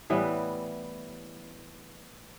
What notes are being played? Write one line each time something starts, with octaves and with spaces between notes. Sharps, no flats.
A2 E3 G3 B3